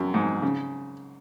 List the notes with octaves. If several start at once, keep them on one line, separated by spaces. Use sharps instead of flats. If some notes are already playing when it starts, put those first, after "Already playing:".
Already playing: F#2
G#2
C#3